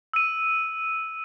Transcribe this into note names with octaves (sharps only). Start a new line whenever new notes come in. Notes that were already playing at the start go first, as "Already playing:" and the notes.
E6 D#7